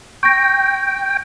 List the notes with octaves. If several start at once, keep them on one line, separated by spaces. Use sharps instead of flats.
G5 C#6 A#6 D7